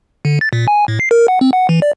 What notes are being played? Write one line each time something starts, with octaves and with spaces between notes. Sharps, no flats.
D3
A6
A#2
G#5
A2
C7
A#4
F#5
C4
F#5
E3
D5